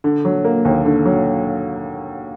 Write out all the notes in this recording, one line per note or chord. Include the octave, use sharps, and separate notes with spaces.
D3
F#3
A#3
D#2
D3
F#3